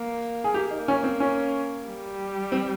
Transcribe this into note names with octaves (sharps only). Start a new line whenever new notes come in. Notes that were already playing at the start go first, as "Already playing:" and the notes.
Already playing: A#3
G#4
A#3 G4
D#4
C#4
C4
C#4
G3
C4